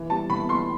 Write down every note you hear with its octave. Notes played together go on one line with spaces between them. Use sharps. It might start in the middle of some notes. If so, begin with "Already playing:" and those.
Already playing: E3
G3 A5
E3 B5
E3 C6